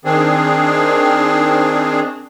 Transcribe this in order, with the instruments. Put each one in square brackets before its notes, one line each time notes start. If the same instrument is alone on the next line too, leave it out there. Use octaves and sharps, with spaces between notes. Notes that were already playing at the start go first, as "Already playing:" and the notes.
[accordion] D#3 C4 D4 G#4